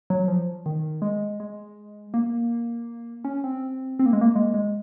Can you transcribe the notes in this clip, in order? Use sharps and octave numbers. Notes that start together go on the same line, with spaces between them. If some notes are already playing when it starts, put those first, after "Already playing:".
F#3
F3
D#3
G#3
G#3
A#3
C#4
C4
C4
A#3
G#3
A#3
G#3
G#3